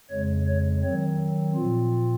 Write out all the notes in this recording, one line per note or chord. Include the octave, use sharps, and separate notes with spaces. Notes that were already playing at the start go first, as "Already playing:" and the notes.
F2 C#3 G#3 C#5
C#5
D#3 F#3 C4 C#5
A#2 F3 C4 F4